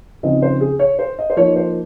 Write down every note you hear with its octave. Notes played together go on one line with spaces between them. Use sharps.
C#3 F3 C4 D#4 D#5
C5
G#4
C#5
C5
D#5
C5
F3 A#3 D#4 C#5
C5